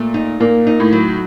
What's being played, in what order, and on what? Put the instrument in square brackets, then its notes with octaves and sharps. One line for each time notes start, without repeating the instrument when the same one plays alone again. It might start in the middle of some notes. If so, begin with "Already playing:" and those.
Already playing: [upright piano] A#2 [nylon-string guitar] A3
[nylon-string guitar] D#4
[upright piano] A#2 [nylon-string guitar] A#3
[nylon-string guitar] D#4
[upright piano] A2
[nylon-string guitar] F#3